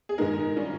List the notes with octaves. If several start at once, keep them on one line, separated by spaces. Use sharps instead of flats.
G#4
G#2 D#3 G#3 D#4 A#4
D#3 G3 C#4 F4